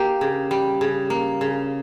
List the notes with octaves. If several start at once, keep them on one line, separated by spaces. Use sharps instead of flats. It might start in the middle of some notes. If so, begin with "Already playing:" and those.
Already playing: A#3 G4
C#3
G3
C#3
A#3
C#3